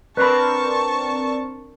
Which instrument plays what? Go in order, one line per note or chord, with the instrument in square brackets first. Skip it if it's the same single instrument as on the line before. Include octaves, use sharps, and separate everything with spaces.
[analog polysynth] C4 D4 A#4 [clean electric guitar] B4 B5 [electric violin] A5 C#6